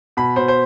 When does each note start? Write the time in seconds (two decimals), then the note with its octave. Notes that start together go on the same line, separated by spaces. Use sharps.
0.17 B2 B5
0.36 B2 C5
0.48 C5